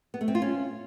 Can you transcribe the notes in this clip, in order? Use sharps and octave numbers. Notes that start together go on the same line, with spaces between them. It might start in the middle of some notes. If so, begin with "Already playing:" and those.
B3
A3
C4
F4
C#4